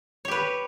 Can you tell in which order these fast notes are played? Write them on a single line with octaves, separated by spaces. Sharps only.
C#5 G4 B4